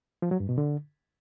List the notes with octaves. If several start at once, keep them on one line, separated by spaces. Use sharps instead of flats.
F3
F#3
G2
B2
D3